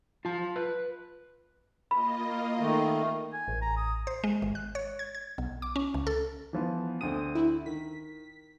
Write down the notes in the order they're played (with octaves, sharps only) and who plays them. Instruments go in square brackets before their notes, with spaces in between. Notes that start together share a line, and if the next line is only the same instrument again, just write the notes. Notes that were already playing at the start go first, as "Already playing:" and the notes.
[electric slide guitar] F4 A5
B4
[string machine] A#3 F4 D#5 [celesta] B5
[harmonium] D#3 A3
[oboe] G#5
[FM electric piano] A1
[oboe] A#5
D#6
[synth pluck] C5
G#3
G#1
F#6
C#5
G#6
G#6
B1
D6
C#4
C#2
A4
[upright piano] E3 F3 B3
[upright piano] D2 C4 D#7 [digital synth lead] D#6
[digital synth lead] E4
[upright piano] D#3 [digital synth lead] B6